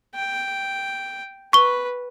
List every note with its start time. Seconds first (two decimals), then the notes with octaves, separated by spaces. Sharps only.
0.15 G5
1.53 B4 C#6 G7